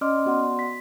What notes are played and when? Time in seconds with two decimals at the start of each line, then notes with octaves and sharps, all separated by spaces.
0.01 C#4 D5 D#5 C6 D6 F6
0.26 B3 F#4 D5 F#5 C6
0.59 B6